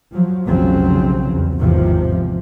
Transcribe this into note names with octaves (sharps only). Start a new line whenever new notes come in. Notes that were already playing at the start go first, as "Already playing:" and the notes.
F3 F#3
F1 B1 C#3 F3 F#3 C4
E2
G#1 E2 C3 F3